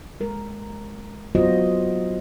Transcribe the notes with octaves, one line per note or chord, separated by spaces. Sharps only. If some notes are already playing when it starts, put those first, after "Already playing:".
G#3 A#4
F#3 B3 F4 F#4 C5 D#5